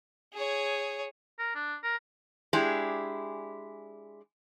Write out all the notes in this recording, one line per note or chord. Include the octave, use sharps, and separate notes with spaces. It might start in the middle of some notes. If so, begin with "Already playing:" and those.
G#4 C#5
A#4
D4
A#4
G#3 D4 E4 G4 G#4